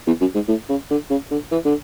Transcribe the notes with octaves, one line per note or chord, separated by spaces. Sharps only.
E2
F#2
G#2
A2
C#3
D3
C#3
D3
E3
D3